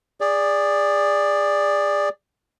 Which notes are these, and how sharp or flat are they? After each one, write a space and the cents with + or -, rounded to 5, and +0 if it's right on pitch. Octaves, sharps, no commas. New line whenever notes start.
G#4 -20 D5 +0